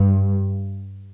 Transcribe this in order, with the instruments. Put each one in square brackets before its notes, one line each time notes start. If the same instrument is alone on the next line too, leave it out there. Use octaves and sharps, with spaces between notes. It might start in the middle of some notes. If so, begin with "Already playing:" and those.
Already playing: [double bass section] G2